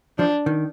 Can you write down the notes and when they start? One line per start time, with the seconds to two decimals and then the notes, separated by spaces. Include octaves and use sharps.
0.18 F3 D4
0.46 D#3